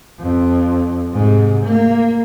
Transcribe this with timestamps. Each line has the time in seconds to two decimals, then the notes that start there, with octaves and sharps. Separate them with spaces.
0.20 F2
1.13 G#2 C3
1.64 A#3